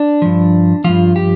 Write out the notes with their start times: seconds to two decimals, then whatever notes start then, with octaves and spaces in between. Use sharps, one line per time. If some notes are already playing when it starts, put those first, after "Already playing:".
Already playing: D4
0.22 G2 F3
0.84 G2 F3 F4
1.16 G4